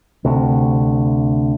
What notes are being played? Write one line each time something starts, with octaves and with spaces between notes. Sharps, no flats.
D2 C3